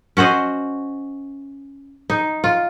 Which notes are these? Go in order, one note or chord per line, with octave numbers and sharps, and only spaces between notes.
C#4 F#4 C5 D#5
D#4
F4